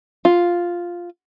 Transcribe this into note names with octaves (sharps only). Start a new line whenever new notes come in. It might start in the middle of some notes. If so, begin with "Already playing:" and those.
F4